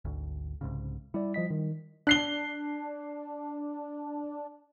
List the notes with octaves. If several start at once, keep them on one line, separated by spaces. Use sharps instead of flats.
G#1 D2
C2 G#2 C#3
G3 E4 D5
F3 D#5 B6
D#3
D4 F#6 C7 G7